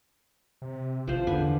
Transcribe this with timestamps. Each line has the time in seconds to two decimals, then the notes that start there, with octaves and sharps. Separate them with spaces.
0.62 C3
1.08 A1 F3 C5
1.27 E2 D3 B4 G#5